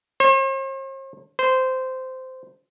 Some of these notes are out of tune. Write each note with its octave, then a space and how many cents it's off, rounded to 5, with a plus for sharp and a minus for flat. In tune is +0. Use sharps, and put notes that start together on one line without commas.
C5 +45
C5 -15